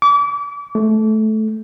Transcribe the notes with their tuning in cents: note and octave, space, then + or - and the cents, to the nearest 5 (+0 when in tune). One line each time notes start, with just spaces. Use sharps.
D6 -35
A3 -15